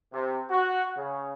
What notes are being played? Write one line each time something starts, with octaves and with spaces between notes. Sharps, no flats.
C3
F#4
C#3